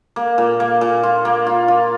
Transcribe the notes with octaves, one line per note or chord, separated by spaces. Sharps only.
A#3
A#2
A#3
A#2
F4
A#3
F4
F4